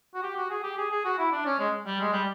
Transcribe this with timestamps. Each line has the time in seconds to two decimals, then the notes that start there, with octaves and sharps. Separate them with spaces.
0.14 F#4
0.23 G4
0.36 F#4
0.50 G#4
0.63 G4
0.78 G#4
0.91 G#4
1.05 F#4
1.18 E4
1.32 D4
1.46 C#4
1.59 G#3
1.86 G3
2.00 G#3
2.12 G3